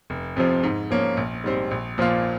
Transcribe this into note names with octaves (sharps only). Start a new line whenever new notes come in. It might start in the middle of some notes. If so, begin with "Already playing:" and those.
F1
F2 C3 F3
G#2
F3 A#3 C#4
A#1
G#2 G3 C4
A#1
A#2 F3 A#3 F4